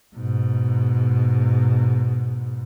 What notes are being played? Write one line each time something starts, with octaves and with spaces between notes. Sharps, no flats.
G#2 B2